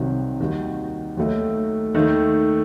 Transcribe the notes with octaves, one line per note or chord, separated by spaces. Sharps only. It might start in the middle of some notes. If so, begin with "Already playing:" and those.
Already playing: C2 C3 D#3 F#3
D#2 D#3 G3 D#4 F#4
D#2 D#3 F#3 A3 D#4
D#2 D#3 A3 D#4